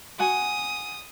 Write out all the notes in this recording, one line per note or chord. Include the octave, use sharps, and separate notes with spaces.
F#4 F#5 G#5 D#6